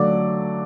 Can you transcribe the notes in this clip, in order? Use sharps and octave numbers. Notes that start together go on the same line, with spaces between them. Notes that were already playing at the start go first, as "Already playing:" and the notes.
Already playing: D3 F#3 A3 F#4 D5 D6